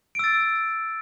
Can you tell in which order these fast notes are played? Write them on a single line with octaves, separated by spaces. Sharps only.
D7 E6 A6